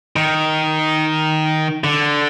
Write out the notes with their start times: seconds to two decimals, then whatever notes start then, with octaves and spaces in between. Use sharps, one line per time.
0.16 D#3
1.84 D3